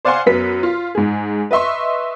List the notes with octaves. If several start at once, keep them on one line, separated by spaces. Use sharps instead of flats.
C5 D5 F5 F#5 G#5 C6
F#2 B3 B4 B6
F4
G#2 G#4
B4 D#5 E5 C6 C#6